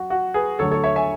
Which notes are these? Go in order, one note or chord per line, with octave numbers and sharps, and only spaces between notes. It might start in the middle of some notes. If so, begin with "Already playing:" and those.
Already playing: F#2 F#4
F#4
G#4 B4
D2 D3 F#3 A4 C#5
A4 C#5
C#5 E5
E5 G#5